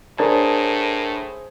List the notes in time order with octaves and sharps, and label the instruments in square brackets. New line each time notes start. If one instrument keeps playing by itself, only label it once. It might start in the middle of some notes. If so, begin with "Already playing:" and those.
[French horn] A2 [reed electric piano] D4 A#4 A5 [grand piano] G#4 C5 C#5